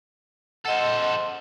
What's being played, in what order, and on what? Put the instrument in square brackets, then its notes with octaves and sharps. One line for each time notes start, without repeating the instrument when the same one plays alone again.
[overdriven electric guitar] A4 C5 [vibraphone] D#5 F#5